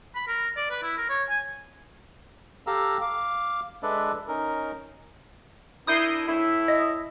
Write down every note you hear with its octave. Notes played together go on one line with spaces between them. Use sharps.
B5
A#4
D5
B4
E4
A#4
C#5
G#5
G4 A4 F5 A#5 E6
F5 D6
G#3 D4 A4 B4 D5 E5
C#4 D#4 A#4
D4 E4 A#4 D#6 G6 C7
A2 E4 E5
D#5